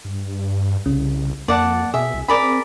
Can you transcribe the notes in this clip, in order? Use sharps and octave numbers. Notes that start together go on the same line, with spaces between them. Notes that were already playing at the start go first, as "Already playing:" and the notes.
G2
C2 C#3
F2 A#3 D5 F#5 A5
B2 G#4 E5
C2
C4 G#4 A#4 D5 B5